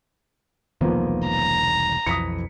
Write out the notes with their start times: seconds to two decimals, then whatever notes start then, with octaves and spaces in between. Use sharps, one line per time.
0.81 E1 C2 D#3 F3 A#3 B3
1.28 A#5
2.07 B1 F2 E3 D#6 B6 C#7